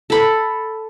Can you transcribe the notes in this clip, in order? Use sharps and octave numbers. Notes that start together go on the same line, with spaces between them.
A4 B5